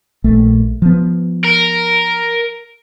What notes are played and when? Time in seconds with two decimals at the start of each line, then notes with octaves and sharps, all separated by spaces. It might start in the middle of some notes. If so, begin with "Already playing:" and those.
0.24 A#1 A3
0.82 F3 B3
1.45 A#4